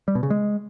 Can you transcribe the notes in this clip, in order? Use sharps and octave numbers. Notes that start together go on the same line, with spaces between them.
G3
B2
C#3
G#3